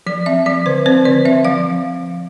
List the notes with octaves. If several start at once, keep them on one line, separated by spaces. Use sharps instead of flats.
F3 D5
C4 E5
F3 D5
D3 C5
C4 C5
D3 D5
C4 E5
F3 F5